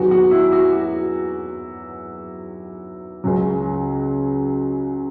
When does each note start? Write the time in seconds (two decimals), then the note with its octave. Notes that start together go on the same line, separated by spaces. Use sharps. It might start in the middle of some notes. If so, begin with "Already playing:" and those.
Already playing: E2 D#3 F#3 F#4
0.11 F#4
0.31 E4
0.52 F#4
0.73 F#4
3.24 C#2 C#3 F#3